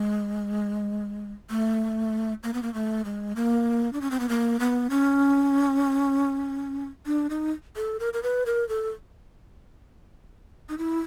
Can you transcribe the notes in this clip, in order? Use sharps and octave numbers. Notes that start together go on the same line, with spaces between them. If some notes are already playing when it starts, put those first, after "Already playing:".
Already playing: G#3
A3
A#3
B3
A#3
A3
G#3
A#3
D4
C#4
C4
B3
A#3
B3
C#4
D4
D#4
A4
A#4
A#4
B4
A#4
A4
D#4
E4